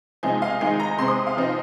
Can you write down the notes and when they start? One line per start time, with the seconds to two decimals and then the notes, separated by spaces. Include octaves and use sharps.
0.23 C3 F3 G#3 D#4 G#5
0.42 F5
0.61 D#3 G#3 D#4 G#5
0.80 A#5
0.98 C3 G#3 C4 C6
1.08 D#6
1.27 F5
1.37 C3 F3 C4 D#4